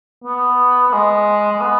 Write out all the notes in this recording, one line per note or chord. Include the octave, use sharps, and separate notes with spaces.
B3
B3
G#3
G#3
B3